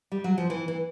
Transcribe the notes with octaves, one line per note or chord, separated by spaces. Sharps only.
G3
F#3
F3
E3
E3